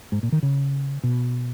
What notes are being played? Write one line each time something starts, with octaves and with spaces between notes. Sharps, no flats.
G#2
A#2
D#3
C#3
B2